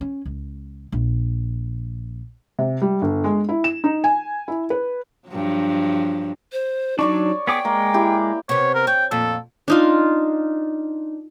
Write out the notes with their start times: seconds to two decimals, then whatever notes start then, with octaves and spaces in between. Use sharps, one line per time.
0.01 C#4
0.25 C#2
0.92 A#1
2.59 C3
2.82 G3
3.01 G1
3.24 G#3
3.49 E4
3.64 E7
3.84 D#4
4.04 G#5
4.48 E4
4.70 B4
5.28 G2 F3 F#3
6.52 C5
6.99 F#3 D4 D#4 C#5 D5 C#6
7.47 B3 G#4 G5 D6
7.65 G#3 A#3
7.94 E4 G4
8.49 C3 B3 C#5
8.74 A#4
8.87 C#5 G5
9.11 F2 A#2 A4
9.68 D4 D#4 F4